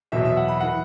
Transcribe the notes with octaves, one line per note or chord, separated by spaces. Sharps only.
E2 B2 F#3 E5
E5
F#5
B5
E3 F#5